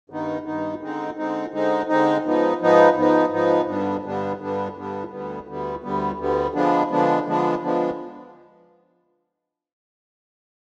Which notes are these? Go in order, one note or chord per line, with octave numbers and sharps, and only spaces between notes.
G2 D#3 B3 D#4
G2 D#3 B3 D#4
D3 G#3 C4 D#4
D3 G#3 C4 D#4
D3 G#3 C4 D#4
D3 G#3 C4 D#4
G#2 F3 B3 D#4
G#2 F3 B3 D#4
G#2 F3 B3 D#4
G#2 F3 B3 D#4
G2 D3 G3 B3 D4
G2 D3 G3 B3 D4
G2 D3 G3 B3 D4
G2 D3 G3 B3 D4
D2 D3 G3 B3
D2 D3 G3 B3
D2 D3 G3 B3
D2 D3 G3 B3
D3 F3 G#3 B3 D4
D3 F3 G#3 B3 D4
D3 F3 G#3 B3 D4
D3 F3 G#3 B3 D4